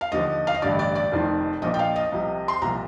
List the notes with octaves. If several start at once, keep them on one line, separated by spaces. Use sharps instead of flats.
F5
D#2 D3 F3 D#5
F5
D#5
A1 G2 D3 D5
D5
D5
F1 F2 D#3
A#1 A#2 F3 D#5
G5
F5
D#5
C2 C3 F3
C6
C2 A#2 F3 A#5